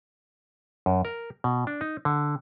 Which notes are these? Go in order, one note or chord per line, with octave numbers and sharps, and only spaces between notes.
F#2
A#4
B2
D4
D#4
D3